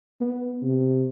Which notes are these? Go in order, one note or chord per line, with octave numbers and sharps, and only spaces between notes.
B3
C3